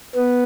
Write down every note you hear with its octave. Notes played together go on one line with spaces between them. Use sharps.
B3